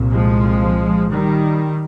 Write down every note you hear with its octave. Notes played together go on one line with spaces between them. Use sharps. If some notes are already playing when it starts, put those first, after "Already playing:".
Already playing: C2 A#2
F3 G#3
D#3 G3